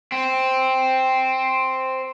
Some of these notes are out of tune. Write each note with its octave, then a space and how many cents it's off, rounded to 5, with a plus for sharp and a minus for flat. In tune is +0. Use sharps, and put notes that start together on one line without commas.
C4 +0